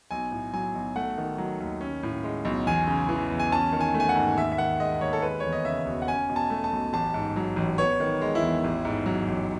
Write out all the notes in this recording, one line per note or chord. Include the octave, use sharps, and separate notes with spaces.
B1 G#5
A2
F#3 G#5
B1
A3 F#5
D#3
F#3
D#2
C#4
A2
G#3
B1
E2 G#5
C#3
E3
E2
G#5
C#4 A5
D#3
G#5
A3
G#5
F#5
G#2
D#2 E5
E5
D#3 F#5
G#3 D#5
D#2 C#5
A4
G#3 B4
E2 C#5
D#5
C#3 E5
E1
F#5
C#4 G#5
B2
A5
A3
A5
B1
A1 A5
G#2
F#3
A1
B3 C#5
D#3
G#3
E4
E2
A1
G#2
F#3
A1